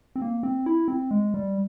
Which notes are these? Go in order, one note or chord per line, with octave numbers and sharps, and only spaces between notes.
C4
A#3
C4
E4
C4
G#3
G3